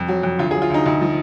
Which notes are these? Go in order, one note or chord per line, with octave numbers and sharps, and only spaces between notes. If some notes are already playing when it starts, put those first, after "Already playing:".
Already playing: F2
F#3
F2
D2 F4
G#4
F#3
F4
D2 D#4
D2 D#4
F3